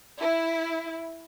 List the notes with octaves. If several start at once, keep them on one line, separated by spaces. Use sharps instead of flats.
E4